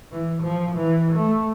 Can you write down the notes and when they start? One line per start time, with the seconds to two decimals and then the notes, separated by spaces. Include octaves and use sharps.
0.12 E3
0.42 F3
0.76 E3
1.16 A3